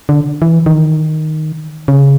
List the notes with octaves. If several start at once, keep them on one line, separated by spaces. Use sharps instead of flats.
D3
E3
D#3
C#3